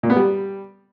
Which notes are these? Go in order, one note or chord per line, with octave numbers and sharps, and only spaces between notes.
A#2
B3
G3